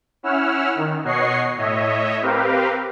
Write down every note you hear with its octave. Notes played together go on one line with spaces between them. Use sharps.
C#4 E4 F#5 E6 F6
D#3
B2 C#5 D#5 F#5 C#6 C7
A2 C#5 D#5 E5
C4 G4 A#4 B4 F5